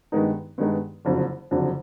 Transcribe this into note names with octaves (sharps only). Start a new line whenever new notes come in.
G2 D#3 G#3 B3 D#4
G2 D#3 G#3 B3 D#4
F#1 F2 D3 F#3
F#1 F2 D3 F#3